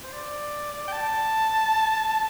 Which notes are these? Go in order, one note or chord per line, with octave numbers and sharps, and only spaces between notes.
C5
D5
G5
A5